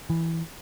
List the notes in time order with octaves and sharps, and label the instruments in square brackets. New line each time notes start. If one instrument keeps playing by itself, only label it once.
[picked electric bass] E3